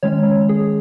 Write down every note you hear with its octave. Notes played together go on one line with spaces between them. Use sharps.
D#3 G#3 C#4 C#5
G#4